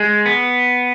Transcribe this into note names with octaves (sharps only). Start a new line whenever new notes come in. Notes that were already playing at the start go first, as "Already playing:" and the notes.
Already playing: G#3
B3